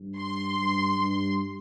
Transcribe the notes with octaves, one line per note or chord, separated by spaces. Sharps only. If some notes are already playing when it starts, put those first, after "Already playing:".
Already playing: G2
C6
G2
G2